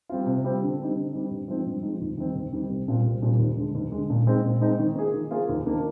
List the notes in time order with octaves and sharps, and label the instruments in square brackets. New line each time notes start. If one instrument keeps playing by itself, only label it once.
[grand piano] G3 C4 F4
C3
G3 C4 F4
D3
G3 C4 D#4
D3
G3 C4 D#4
G2
F3 G#3 C4 D#4
G2
F3 G#3 C4 D#4
D#2
D#3 G3 C4
D#2
D#3 G3 C4
C2
A#2 G3 C4 F4
C2
A#2 G3 C4 F4
D#2
D3 G#3
D#2
D3 G#3
A#2
G#3 C4 D#4
A#2
G#3 C4 D#4
D#3
A#3 F4 G#4
D#3
A#3 F4 G#4
D#2
D#3 A#3 D4 F4